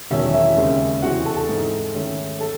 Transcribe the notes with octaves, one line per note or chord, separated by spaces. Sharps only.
E1 E2 D#3 F#3 C#4 E4 E5
E4 E5
D#2 C#3 G#3 C4
E2 C3 E3 C4 F#4 F#5
A4 A5
A4 A5
G#2 E3 C4 D#4
G#2 D#3 A3 C#4 E4
A4 A5